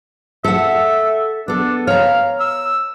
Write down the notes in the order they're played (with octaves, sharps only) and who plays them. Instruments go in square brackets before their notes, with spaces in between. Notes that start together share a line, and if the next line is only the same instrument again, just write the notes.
[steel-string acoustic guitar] A4 F#5 [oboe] E5
[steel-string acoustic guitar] B3 A4 [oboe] D4
[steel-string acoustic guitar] C#5 A#5 [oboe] F5
[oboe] E6